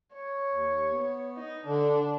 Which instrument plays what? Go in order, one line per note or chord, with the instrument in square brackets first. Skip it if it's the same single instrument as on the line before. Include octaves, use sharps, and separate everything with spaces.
[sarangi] C#5
[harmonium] D#2
B3
[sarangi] D#4
[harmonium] D3 [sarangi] D4